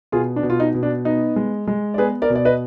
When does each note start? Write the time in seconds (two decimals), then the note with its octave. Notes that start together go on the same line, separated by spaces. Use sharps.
0.12 B2 F4 G#4
0.36 D4
0.43 B2
0.50 F4
0.60 D#4
0.75 B2
0.83 D4
1.05 B3 D#4
1.36 G#3
1.67 G#3
1.94 D5
1.98 B3 G#4 B4
2.22 A#4 D5
2.30 B2
2.35 D5
2.45 B4 D#5